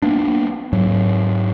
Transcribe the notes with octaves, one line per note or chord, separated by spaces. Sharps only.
A#3 B3 D4
G#2 F#3